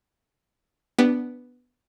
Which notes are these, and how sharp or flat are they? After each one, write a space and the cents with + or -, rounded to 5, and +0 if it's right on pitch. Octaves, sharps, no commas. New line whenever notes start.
B3 +0 D4 +0 G4 +15